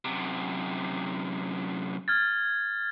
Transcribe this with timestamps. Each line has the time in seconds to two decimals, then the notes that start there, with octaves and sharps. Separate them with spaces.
0.05 F#2 C3
2.08 F6 G#6 A6